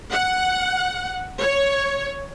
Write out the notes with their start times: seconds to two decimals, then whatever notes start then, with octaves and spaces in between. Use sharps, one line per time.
0.12 F#5
1.41 C#5